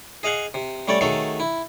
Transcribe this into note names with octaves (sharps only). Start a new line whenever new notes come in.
G#4 D#5 F5 F#5 G#5
C3
G3 A3 C#4 C#5 D5
D#3 F#3 A3 G#4 A4 C#5
E4